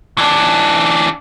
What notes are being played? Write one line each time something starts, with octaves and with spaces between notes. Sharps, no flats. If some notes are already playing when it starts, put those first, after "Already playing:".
E3 D4